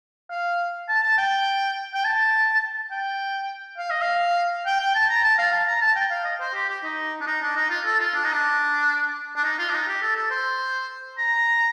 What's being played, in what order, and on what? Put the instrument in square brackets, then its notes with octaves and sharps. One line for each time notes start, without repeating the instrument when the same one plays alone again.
[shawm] F5
A5
A5
G5
G5
A5
G5
F5
D#5
F5
G5
G5
A5
A#5
A5
F5
A5
A#5
A5
G5
F5
D#5
C5
G4
G4
D#4
D4
D#4
D4
D#4
F4
A4
F4
D4
D#4
D4
D4
D#4
F4
D4
D#4
G4
A4
A4
C5
A#5